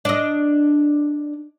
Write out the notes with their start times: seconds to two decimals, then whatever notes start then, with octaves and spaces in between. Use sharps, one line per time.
0.05 D4 D#5